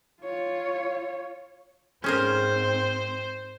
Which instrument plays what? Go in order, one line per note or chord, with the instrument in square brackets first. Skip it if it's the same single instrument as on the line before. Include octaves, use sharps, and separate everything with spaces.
[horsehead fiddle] F4 C#5
[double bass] G#2 C4 [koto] C#4 G#4 A#4 [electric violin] C5